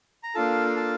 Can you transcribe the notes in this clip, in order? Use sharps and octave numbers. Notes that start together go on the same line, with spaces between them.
A#5
A#3 D4 F4 A4 A5
A5